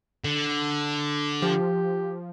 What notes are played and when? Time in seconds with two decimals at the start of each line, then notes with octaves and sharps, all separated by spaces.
0.24 D3
1.42 F3 G4